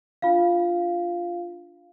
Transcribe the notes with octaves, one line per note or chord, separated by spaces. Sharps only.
D4 F4 F5